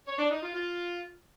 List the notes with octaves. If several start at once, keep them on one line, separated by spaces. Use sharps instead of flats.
C#5
D4
D#4
F4
F4